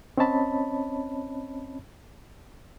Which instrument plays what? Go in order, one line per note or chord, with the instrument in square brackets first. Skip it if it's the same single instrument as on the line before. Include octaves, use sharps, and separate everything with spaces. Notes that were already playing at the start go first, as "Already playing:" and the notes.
[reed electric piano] C4 C#4 C#5 D#5 A5 B5